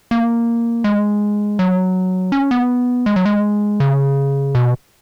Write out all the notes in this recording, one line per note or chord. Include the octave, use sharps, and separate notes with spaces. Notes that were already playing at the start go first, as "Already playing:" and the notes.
A#3
G#3
F#3
C#4
B3
G#3
F#3
G#3
C#3
B2